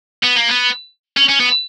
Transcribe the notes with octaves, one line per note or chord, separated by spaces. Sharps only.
B3
A#3
B3
C#4
C#4
B3